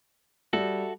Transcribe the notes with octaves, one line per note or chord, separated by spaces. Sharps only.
G3 F#4 A4 E5